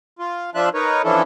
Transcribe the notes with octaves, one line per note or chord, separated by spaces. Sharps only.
F4
F3 D4 F4 E5 F#6
D#4 A#4 B4 C#5
E3 F3 C#4 D4 E4 A4